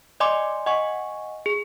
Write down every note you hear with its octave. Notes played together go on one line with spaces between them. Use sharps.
D5 D#5 G#5 C6 D6
D#5 F#5 G#5 C#6
G#4